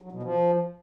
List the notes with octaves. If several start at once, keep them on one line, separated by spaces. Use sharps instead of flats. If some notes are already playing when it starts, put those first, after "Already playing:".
F#3
B2
F3